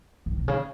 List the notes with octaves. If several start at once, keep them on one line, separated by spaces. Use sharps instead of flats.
G2
B2
C#3